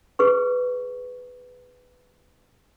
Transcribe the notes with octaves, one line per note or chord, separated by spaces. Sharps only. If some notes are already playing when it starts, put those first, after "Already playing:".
G#4 B4 C#6